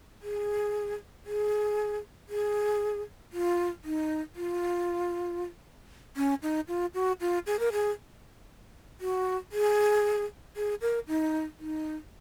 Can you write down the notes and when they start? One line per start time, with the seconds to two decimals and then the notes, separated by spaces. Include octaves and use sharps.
0.22 G#4
1.26 G#4
2.29 G#4
3.33 F4
3.84 D#4
4.36 F4
6.17 C#4
6.42 D#4
6.68 F4
6.94 F#4
7.21 F4
7.46 G#4
7.59 A#4
7.72 G#4
9.01 F#4
9.52 G#4
10.57 G#4
10.81 A#4
11.08 D#4
11.59 D#4